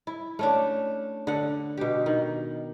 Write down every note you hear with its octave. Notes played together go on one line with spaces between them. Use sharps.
E4
A3 C#4 D4
D3 F#5
B2 G4
D#3